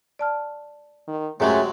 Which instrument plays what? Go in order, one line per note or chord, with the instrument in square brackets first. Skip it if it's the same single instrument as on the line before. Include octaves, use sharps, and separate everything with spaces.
[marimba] D5 A5 F6
[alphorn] D#3
[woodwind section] F#2 A3 [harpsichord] C3 F#3 G#3 [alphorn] G#4